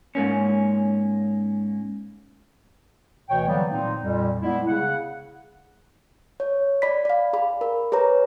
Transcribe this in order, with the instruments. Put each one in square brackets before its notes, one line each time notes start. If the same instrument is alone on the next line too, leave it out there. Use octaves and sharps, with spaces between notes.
[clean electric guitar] G#2 A#3 C#4
[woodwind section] D2 B2 E3 C#5 G5
D3 E3 F#3 G3 A#3 B3
A#2 C4 D#4
F2 A#2 G3
G3 G#3 B3 E4
C#3 F#5
[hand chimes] C#5
D5 B5 B6
D5 F5
G#4 B5
A#4
G#4 B4 C#5 A#5